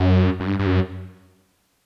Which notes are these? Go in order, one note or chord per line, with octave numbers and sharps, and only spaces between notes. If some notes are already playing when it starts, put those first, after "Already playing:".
Already playing: F#2
F#2
G2
G2
F#2